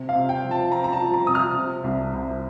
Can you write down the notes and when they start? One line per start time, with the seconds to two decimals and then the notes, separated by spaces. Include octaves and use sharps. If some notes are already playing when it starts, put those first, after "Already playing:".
Already playing: C3
0.09 F5
0.15 C3
0.29 G5
0.44 F3
0.51 A5
0.71 C3 A#5
0.84 A#5
0.93 A5
0.99 F3
1.14 A#5
1.27 C3 D#6
1.35 F6
1.57 C3
1.84 C2
2.13 C2